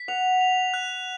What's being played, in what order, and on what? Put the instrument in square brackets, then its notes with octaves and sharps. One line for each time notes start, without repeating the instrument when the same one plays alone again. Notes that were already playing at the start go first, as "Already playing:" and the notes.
Already playing: [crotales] B6
[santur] F#5 [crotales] F7
[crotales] F7
F#6